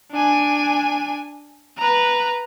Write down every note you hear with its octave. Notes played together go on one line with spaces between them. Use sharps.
D4 G#5
B4 A#5